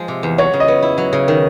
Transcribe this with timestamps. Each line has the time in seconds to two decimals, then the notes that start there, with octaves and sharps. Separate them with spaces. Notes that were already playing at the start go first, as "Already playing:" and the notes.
Already playing: F3 G#3
0.08 C3
0.23 E2
0.38 F#3 C#5
0.53 C#3
0.60 D#5
0.68 B3
0.82 E4
0.98 F#3
1.13 C#3
1.28 D#3